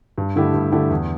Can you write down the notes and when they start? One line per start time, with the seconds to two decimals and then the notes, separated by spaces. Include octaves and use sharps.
0.18 G2
0.36 D3 A3 E4 G4
0.54 G2
0.72 D3 A3 E4 G4
0.91 E2